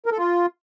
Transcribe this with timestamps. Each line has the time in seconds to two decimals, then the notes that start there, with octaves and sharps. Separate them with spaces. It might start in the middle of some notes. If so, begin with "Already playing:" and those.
0.06 A#4
0.12 A4
0.18 F4